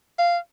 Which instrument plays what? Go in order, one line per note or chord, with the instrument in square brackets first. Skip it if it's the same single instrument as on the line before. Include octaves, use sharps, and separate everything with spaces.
[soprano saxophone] F5